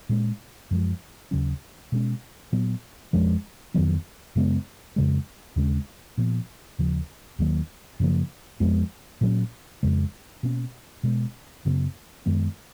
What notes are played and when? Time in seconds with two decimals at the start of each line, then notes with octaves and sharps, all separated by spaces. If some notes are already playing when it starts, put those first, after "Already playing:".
0.09 A#2 G#3 C#4
0.71 F#2 F3 G#3
1.31 D#2 C#3 F#3 C#4
1.92 B2 G#3 C#4
2.52 A#2 F#3 B3
3.13 F2 F3 G#3 C#4
3.74 F2 D#3 F#3 B3
4.35 F#2 C#3 G#3 B3
4.96 F2 C#3 G#3
5.56 D#2 C#3 G#3 C#4
6.17 A#2 F3 B3
6.79 D#2 C#3 F3
7.39 D#2 D#3 F#3 A#3
8.00 F#2 C#3 F3 A#3
8.60 F2 F3 G#3 B3
9.21 A#2 F#3 C#4
9.83 F2 C#3 G#3
10.43 B2 A#3 C#4
11.03 B2 G#3 B3
11.65 F#2 C#3 F#3 B3
12.26 F#2 D#3 G#3 B3